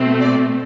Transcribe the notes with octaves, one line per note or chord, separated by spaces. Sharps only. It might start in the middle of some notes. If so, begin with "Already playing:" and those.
Already playing: B2 A3 C4
D5